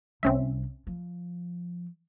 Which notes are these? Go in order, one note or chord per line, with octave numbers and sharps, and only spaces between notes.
C2 G3 C4 C#4 E5
F3